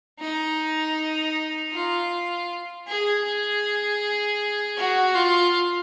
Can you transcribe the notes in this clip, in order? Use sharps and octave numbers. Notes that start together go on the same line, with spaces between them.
D#4
F4
G#4
G#4
F#4
F4